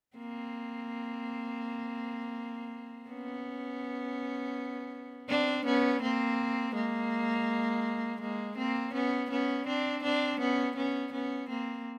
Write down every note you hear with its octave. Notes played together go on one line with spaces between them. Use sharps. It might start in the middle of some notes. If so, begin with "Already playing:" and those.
A#3 C4
B3 C#4
C4 D4
B3 C#4
A#3 C4
G#3 A#3
G#3 A#3
A#3 C4
B3 C#4
B3 C#4
C4 D4
C4 D4
B3 C#4
B3 C#4
B3 C#4
A#3 C4